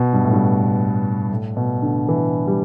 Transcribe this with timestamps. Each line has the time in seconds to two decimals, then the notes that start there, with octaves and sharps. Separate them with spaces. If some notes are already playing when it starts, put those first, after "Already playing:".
Already playing: B2
0.13 G2
0.24 A2
0.33 G2
1.31 A2
1.57 B2
1.82 D3
2.09 E3
2.47 G3